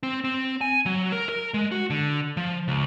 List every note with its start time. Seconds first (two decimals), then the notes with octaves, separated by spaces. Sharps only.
0.03 C4
0.24 C4
0.61 G#5
0.86 F#3
1.12 A#4
1.29 A#4
1.54 G#3
1.72 F#4
1.90 D3
2.37 F3
2.68 C#2